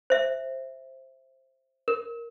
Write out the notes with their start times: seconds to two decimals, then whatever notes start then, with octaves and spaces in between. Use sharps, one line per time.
0.10 C5 E5
1.88 A#4